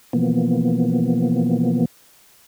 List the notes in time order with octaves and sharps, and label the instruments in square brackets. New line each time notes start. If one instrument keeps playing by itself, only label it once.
[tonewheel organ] B2 E3 F3 A#3 B3